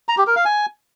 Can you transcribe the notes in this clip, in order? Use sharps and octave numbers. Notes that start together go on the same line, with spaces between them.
A#5
G4
A#4
F5
G#5